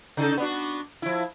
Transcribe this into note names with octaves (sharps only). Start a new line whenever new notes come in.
C#3 D#4 A4
B3 D4 F#4
F3 E4